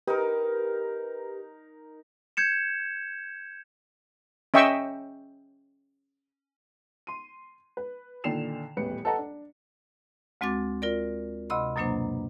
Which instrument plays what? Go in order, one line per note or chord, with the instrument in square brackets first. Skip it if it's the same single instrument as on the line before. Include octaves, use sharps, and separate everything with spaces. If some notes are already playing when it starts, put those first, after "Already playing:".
[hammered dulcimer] D#4 A#4 [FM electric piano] G4 B4
[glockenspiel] G6 G#6 C#7 E7
[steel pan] C#4 D#5 E5 G5 C#6 E6
[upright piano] C6 D#7
B4
A#2 D3 D#3 C7 E7 F7
D#1 A1 E2 B4 C#7
A4 B4 D#5 F#5 A5 A#5
D4
[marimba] D2 G#3 C4 F#4 D6 A6
F4 A#4 D5
D2 C3 D#5 B5 C6
F#2 B2 F#3 A#3 D4 C5